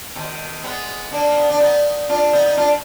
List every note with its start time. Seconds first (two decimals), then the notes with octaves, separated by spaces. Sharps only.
0.15 B2 D#3
0.64 G#3 B3
1.12 A#3 D4
1.27 A#3
1.38 B3
1.49 D4
1.60 B3 D#4
2.09 D4 F4
2.33 B3 D#4
2.46 D#4
2.57 D4 F4